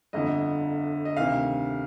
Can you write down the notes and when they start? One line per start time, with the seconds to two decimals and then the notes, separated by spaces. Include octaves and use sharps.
0.13 G1 F2 D3 D#5
1.05 D#5
1.17 D2 C3 D#3 F5